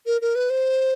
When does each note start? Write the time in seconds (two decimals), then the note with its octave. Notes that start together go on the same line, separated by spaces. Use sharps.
0.06 A#4
0.21 A#4
0.35 B4
0.50 C5